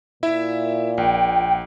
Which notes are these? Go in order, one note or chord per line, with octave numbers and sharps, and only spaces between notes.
A#2 E4 E5
A#1 G5